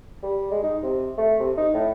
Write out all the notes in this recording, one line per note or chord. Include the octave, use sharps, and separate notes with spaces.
G3
G#3
D#4
C3
A3
C3
D#4
A2